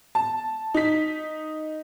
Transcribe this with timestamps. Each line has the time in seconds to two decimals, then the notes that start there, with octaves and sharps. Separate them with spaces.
0.15 A5
0.74 D#4 B6